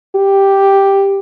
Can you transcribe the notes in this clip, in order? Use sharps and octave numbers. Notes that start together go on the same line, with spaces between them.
G4